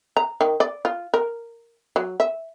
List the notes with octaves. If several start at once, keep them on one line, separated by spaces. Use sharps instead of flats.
A#5
D#3
D5
F4
A#4
F#3
E5